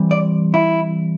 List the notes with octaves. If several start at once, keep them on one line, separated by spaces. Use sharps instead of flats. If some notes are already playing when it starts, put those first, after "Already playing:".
Already playing: E3 G3 C4
D5
E4